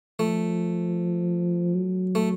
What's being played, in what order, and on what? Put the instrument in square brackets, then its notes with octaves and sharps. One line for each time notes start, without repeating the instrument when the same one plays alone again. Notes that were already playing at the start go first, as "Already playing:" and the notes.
[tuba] F3 [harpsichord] A3
[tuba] F#3
[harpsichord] A3